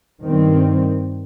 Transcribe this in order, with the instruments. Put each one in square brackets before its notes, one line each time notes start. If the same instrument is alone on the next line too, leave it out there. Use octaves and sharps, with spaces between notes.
[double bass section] G2 D#3 G3 C4